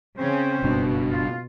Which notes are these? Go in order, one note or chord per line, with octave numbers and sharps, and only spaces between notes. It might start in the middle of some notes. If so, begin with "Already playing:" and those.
C#3 C4 C#4 C5
F#1 G2 B2 D4
F4